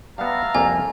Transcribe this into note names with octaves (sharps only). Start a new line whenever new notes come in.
G3 B3 E5 F5 A5 A#5
C2 F2 A#3 G#5